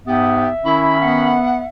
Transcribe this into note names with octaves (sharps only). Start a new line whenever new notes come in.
G#2 B3 G4 E5
D#3 C#4 E4 B5
B3 F#5